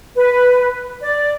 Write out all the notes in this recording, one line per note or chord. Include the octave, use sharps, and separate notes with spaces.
B4
D5